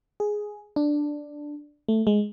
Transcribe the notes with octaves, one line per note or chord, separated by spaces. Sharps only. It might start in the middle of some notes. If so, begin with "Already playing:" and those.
G#4
D4
A3
G#3